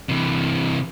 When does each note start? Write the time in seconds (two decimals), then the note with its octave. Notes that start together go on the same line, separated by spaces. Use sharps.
0.09 C3 E3